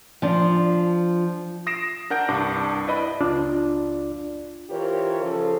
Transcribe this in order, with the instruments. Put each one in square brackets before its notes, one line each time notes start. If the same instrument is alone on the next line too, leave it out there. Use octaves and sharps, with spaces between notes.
[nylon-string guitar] F3 D4
[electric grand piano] D#6 A#6 C7 D7 E7
D4 A#4 F#5 G6 A#6 D7
C2 G2 D4 D6
E4 B4 D5 D#5 B5
[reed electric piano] C#2 D4 F4 D5
[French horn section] E3 F4 G4 A#4 C5 C#5
C#3 F3 F4 A4